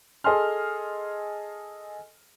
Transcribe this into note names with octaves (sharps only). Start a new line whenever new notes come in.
G#4 A4 D#5 G#5 C6 F6